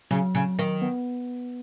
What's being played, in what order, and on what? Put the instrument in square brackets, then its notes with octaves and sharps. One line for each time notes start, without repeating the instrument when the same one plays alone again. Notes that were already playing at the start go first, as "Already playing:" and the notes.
[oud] C#3 [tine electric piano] F#3
[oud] C#3
D#3
[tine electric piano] B3